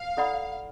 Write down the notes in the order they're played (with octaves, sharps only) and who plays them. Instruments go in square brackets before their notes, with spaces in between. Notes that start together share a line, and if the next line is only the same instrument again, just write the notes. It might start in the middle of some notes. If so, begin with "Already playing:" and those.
Already playing: [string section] F5
[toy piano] E4 A4 D5 F#5 B5